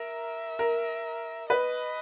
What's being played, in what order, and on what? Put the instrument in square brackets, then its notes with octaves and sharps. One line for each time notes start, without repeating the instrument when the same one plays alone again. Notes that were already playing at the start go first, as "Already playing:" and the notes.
Already playing: [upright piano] A#4 [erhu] E5
[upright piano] A#4
[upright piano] B4 [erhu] D#5